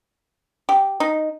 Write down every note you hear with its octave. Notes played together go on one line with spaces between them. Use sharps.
G4
D#4